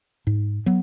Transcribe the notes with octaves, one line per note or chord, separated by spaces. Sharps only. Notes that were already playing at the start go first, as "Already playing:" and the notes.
G#2
F#3 B3